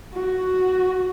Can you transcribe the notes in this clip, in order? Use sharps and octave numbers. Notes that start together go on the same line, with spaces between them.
F#4